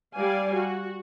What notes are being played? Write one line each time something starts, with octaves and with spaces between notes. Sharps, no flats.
G3 D5 F5 G#5
F#4